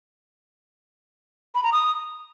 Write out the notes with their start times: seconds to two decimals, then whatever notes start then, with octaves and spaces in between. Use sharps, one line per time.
1.55 B5
1.64 A#5
1.72 D#6